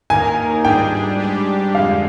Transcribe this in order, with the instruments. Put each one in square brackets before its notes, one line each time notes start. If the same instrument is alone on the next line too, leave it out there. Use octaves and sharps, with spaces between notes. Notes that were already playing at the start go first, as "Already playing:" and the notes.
[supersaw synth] D#2 D#3 A#3 D#4 A#4 [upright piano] G#5
[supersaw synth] G#2 G3 D4 G#4 [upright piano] G5
[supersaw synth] G#2 G3 D4 G4
[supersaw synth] F2 D3 G#3 [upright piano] F5